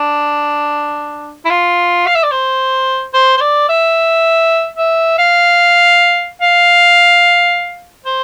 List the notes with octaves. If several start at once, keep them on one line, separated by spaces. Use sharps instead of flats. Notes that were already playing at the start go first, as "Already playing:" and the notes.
Already playing: D4
E4
F4
F5
E5
D5
C5
C5
C5
D5
E5
E5
F5
F5
C5